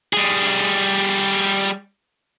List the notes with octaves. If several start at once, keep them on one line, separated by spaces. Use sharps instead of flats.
G3 G#4